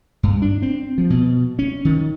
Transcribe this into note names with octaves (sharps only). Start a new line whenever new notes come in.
G2
D4
C4
F3
B2
C#4
D#3